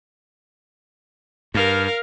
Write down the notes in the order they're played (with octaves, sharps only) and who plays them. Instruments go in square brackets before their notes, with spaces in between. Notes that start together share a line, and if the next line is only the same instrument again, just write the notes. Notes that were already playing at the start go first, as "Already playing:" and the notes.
[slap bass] G2 [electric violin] A#4 F5